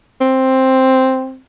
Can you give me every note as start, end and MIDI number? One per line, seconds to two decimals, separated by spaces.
0.21 1.39 60